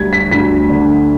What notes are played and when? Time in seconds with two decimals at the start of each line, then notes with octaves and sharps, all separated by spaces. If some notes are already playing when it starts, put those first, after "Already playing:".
Already playing: D2 G3 G#6 B6
0.13 B6
0.31 D2 B6
0.69 D3